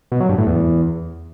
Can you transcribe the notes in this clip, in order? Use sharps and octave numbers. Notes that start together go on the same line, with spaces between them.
B2
F#3
G2
A2
E2